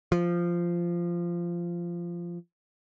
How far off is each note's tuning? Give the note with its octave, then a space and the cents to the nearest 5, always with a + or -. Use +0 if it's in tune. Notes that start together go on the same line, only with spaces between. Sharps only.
F3 -15